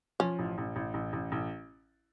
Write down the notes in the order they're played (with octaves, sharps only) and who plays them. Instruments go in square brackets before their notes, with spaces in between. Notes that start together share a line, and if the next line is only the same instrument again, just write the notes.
[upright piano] F3 [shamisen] C#4
[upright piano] A1
A1
A1
A1
A1
A1